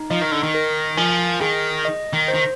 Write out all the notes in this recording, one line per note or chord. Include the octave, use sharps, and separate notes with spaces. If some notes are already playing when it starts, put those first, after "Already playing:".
Already playing: D#4
F3 D#5
D#3
D3
D#3
A#4
F3 G#5
D#3 G#4
D#5
D#3
C5
D#3